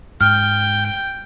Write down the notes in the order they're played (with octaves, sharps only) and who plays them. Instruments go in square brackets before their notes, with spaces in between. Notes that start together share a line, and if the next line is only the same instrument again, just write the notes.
[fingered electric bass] G#2 [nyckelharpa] G5 [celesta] F6